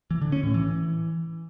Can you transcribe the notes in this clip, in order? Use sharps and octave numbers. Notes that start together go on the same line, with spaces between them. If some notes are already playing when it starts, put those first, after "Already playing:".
E3
D3
C#4
A2
E3